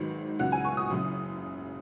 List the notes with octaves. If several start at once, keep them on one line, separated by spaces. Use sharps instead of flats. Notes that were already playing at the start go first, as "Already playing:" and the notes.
Already playing: G#1 G#2 D#3 F#3 B4
C#2 C#3 F#3 F#5
G#5
C#6
D#6
F#1 F#2 C#3